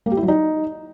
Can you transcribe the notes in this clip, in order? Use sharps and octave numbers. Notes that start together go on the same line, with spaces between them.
A#3
G4
E4
F#3
D#4